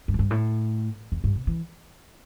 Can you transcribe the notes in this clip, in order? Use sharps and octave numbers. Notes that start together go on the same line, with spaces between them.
G2
E2
G2
A2
E2
G2
B2
E3